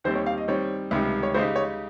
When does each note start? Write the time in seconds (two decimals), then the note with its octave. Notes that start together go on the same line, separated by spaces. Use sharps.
0.04 D#2 D#3 G3 C4 G4 C5
0.15 C#5
0.26 F5
0.38 D#5
0.48 D#3 G3 C4 C#5
0.91 C#2 C3 D#3 G3
1.23 C#5
1.34 C#3 G#3 D#4 G4 C5
1.56 C#5